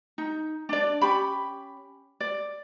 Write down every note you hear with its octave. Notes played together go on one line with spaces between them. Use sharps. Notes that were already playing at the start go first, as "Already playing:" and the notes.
D#4
D4 D5
C#4 G4 B5
D5